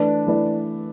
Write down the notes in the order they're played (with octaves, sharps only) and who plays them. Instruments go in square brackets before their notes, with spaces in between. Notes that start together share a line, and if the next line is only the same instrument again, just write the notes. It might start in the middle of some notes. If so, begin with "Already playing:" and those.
Already playing: [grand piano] E3 A3 E4 B4 D5 [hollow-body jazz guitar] D4
[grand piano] E3 A3 E4 B4 D5